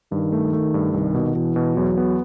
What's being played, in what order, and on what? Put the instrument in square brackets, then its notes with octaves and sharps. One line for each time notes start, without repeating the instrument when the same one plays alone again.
[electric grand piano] G2 [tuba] D#3
[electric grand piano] A3
A3
G2
[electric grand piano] C2 [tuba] D#3
[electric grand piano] B2
[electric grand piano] B2 [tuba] E3
[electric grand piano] B2
[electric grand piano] E2 [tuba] F#3
[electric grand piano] B3